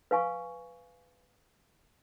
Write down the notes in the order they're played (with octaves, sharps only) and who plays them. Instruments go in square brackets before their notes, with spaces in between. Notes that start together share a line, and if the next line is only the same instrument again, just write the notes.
[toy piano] B4 F5 G#5 C#6